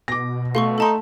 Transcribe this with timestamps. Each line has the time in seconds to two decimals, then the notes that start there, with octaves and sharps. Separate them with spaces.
0.08 B2 D6 A#6
0.55 A3 F5 C6 C#6
0.78 D#4 A4 A5 C6